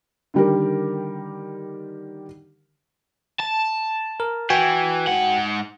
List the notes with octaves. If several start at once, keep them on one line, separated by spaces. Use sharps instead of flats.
D3 D#3 G3 G4 A#4
A5
A#4
E3 F#4 G5 G#5
G#2 F#5